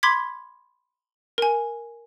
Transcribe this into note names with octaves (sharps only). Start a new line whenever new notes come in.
B5 C6 D6 G#6 B6
A#4 G#5